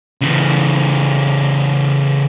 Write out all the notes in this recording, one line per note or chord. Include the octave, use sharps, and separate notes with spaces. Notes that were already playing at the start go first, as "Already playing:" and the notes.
C#3 E3